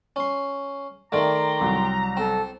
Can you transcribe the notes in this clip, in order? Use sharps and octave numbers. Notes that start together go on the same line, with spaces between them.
C#4 C6
D#3 A3 A#4 D5 G5 A#5 C6 D6
C2 F#3
C4 A4